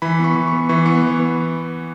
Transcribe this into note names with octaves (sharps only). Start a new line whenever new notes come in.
E3 B5
B3 C#6
E3
C#6
B3
E3 C#6
B3
E3
B3